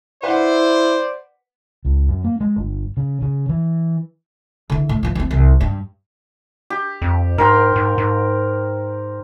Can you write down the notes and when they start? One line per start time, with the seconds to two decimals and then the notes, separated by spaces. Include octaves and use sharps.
0.23 E4 B4 C5 D5 F#5
1.85 C#2
2.08 F#2
2.24 A#3
2.41 G#3
2.56 G1
2.97 C#3
3.22 C#3
3.49 E3
4.70 D3 E3
4.89 A2
5.03 E3 F3
5.15 E3 C4
5.31 C2
5.61 G2
6.70 G4
7.02 F2
7.38 G#2 A#4 G5 C6
7.76 G#2
7.98 G#2